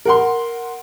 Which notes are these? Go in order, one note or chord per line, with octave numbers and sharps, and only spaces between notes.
A#4 F#5 C6